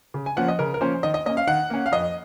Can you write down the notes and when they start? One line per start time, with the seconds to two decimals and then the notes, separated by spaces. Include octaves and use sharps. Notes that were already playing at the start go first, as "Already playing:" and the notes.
0.14 C#3
0.26 G#5
0.37 F3 A#3 C#4 F#5
0.48 D#5
0.59 C#3 A#4
0.74 A#4
0.81 F3 A#3 C#4 C5
1.03 D#3 D#5
1.14 D#5
1.26 A#3 C#4 D#5
1.37 F5
1.47 D#3 F#5
1.70 A#3 C#4
1.86 F5
1.92 F2 D#5